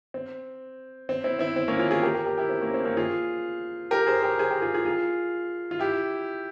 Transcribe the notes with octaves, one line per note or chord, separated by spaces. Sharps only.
C4
C4
C4 E4
C4 E4
C4
A#3 C#4
C#4 F4
F4 G#4
G4 A#4
G4 A#4
G4 A#4
E4 G4
C4
A#3 C#4
C4
A#3 C#4
F4 G#4
G4 A#4
G#4 C5
G4 A#4
G#4 C5
G4 A#4
F4 G#4
F4 G#4
F4 G#4
F4
E4 G4